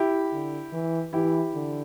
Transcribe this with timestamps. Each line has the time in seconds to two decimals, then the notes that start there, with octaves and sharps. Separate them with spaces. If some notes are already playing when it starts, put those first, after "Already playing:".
Already playing: E4 G4
0.32 D3
0.73 E3
1.13 E3 E4 G4
1.54 D3